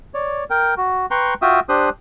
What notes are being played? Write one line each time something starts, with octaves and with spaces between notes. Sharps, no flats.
C#5 D5
A#4 G5
F#4
B4 G5 A#5 C6 C#6
F4 F#4 E5 G5 D#6
D4 G4 C5 D#6 F#6